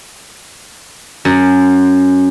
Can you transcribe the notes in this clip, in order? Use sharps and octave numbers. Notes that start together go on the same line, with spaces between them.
F#2